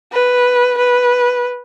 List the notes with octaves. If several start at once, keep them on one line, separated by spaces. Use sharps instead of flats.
B4
B4